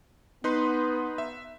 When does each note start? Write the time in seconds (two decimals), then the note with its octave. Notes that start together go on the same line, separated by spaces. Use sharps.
0.44 B3 D#4 B4 C6
1.18 E5